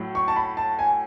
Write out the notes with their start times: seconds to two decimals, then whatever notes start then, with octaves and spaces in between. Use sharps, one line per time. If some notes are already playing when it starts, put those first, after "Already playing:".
Already playing: A2 F#3
0.15 C#6
0.28 A5
0.36 B5
0.57 A5
0.79 G#5